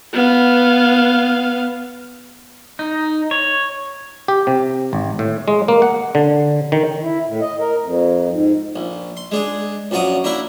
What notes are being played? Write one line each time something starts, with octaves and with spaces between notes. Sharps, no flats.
B3 F5
D#4
C#5
G4
C3
G#1
A2
G#3
A#3
F#5
D3
D#3
E4
A2
D#5
A#4
F2
G#2
A#1
C6
G#3 D4 G#4
A#1 F#2 F#4 D5 A#5 D#6
A#3 D4 E4 A#4